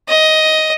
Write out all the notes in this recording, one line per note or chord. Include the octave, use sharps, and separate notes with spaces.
D#5